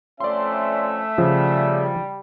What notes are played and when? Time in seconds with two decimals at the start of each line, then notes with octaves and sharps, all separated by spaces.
0.20 F2 A3 C#4 D5 E5 C6
1.18 C#3 F3 G3